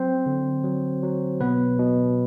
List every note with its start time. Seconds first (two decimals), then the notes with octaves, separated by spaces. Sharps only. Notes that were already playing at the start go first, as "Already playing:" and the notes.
Already playing: F#3 C4 C5
0.26 D3
0.64 F#3
1.03 F#3
1.41 B2 B3 B4
1.79 B2